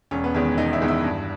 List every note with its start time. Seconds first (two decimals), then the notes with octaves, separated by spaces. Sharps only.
0.11 E1 C#4
0.24 B3
0.34 E2 D#3 G#3 C#4
0.57 E1 D#4
0.73 E4
0.81 E2 D#3 G#3
0.88 E4
1.04 G2